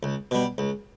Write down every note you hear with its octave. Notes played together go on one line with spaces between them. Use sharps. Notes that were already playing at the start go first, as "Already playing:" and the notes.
C#2
B2 G3
C#2